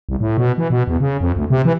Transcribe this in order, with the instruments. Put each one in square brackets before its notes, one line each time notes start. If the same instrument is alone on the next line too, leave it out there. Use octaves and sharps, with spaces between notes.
[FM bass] C2
A2
B2
E3
B2
E2
C#3
F2
D2
C3
E3